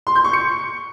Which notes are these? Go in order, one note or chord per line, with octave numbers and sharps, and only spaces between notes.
C6
G6
C#6
C#7